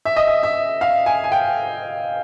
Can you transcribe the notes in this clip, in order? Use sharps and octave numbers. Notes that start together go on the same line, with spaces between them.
E5
D#5
E5
E5
F5
G#5
G#5
G5